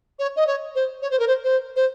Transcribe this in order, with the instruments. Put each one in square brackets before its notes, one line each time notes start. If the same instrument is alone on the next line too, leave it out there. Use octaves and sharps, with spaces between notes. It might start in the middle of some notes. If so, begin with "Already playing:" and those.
[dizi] C#5
D#5
C#5
C5
C#5
C5
A#4
C5
C5
C5